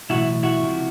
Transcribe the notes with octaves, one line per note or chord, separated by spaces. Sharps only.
B1 A2 E3 E4 F#4
E4 F#4
C#2 C3 F3